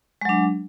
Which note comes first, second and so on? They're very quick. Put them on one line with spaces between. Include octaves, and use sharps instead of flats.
G#3 F#3 D4